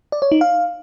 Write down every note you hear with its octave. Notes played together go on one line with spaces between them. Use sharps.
D5
C#5
D#4
F5